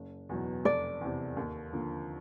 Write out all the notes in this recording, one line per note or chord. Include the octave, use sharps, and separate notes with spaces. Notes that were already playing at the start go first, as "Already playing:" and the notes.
Already playing: F#1
E2 B2 F#3
F1 D5
E2 C3
D#2
D3 F3 A#3